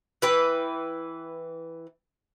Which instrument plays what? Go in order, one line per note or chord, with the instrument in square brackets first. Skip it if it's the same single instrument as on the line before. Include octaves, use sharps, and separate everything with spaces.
[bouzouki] E3 B4 G5